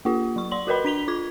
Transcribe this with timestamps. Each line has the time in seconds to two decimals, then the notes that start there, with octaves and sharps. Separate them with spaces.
0.05 A#3 F4 G4
0.36 F#3 C#6
0.51 D5 C6 F#7
0.67 F#4 A#4 B4 D#5 B5
0.85 D4 B6 F7 G7
1.08 F4 D6 G#6